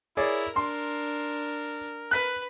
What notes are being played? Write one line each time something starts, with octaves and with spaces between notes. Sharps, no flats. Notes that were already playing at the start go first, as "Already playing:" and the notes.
E4 G#4 A#4 C#5 D5
D4 A#4 C6
B4 F#6 B6